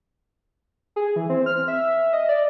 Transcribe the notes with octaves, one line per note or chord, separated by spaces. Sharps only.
G#4
E3
C4
F6
E5
D#5
D5